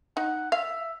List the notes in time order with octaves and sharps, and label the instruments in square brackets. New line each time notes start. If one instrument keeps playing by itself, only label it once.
[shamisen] D#4 [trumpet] F#5
[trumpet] E5 [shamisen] F5